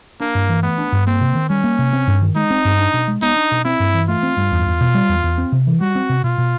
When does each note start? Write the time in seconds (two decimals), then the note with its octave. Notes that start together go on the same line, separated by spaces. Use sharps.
0.20 A#3 D4
0.35 G2
0.49 E3
0.63 A3 B3
0.78 D4
0.92 G2
1.07 A#3 C4
1.21 C3
1.35 D#3
1.49 G3 C#4
1.64 A#3
1.79 C3
1.93 C4
2.07 G2
2.22 D#3
2.36 G#3 D#4
2.50 C4
2.65 G2
2.79 D4
2.94 B2
3.08 G#3
3.22 B3 D#4
3.36 D4
3.51 B2
3.65 C4 E4
3.80 G2
3.94 E3
4.09 A3 F4
4.23 C4
4.37 G2
4.52 E2
4.66 E2
4.81 B2
4.94 G3
5.09 E2
5.24 E2
5.38 C4
5.52 C3
5.67 E3
5.81 G3 F#4
5.95 C4
6.09 C3
6.24 B2 F4
6.38 B2